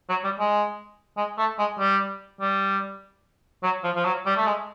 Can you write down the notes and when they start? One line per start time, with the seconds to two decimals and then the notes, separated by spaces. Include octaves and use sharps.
0.09 F#3
0.24 G3
0.39 G#3
1.17 G#3
1.38 A3
1.59 G#3
1.79 G3
2.41 G3
3.63 F#3
3.84 F3
3.95 F3
4.05 F#3
4.26 G3
4.37 A3
4.46 G#3